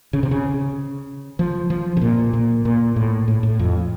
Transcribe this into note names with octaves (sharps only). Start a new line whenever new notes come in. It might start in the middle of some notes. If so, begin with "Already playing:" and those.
C#3
C3
C#3
F3
F3
C3
A#2
A#2
A#2
A2
A2
A2
F2